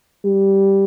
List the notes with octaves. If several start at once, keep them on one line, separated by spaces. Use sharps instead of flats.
G3